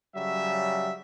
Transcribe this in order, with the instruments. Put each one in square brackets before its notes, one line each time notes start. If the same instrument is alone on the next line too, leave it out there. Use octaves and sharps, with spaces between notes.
[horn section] C#3 F#3 G3 E5